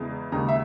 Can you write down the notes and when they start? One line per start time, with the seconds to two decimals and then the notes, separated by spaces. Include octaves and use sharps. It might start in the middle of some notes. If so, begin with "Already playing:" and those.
Already playing: E2 C#3 E3 G#3
0.32 D#2 C#3 G#3 A#5
0.49 E5